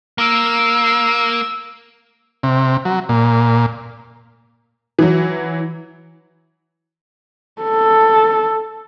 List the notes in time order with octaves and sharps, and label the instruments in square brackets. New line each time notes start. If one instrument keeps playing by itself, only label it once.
[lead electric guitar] A#3 [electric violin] E6
[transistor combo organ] C3
F#3
A#2
[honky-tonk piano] E3 F#3
[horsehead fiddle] A4